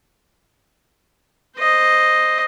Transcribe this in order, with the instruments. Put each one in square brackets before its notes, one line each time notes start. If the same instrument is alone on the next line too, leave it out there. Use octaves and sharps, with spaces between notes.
[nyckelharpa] C5 D#5